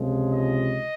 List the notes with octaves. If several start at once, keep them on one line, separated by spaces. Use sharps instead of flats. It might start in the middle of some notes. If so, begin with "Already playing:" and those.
Already playing: C#2 C3 F3 G#3
D#5